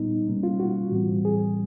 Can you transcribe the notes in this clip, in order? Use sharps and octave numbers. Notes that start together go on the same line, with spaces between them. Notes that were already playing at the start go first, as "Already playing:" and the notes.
Already playing: A#2 G3 B3 D#4
B2 G3 A#3 C#4
F4
F#4
A2 E3 G3 C4
G#4